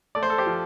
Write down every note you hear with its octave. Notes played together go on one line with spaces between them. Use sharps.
A3 D5
C5
A4
G4 C5
F3